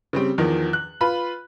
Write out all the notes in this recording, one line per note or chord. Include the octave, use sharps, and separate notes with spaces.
C#3 G3 C4
E2 D#3 F3
F#6
F4 B4 B5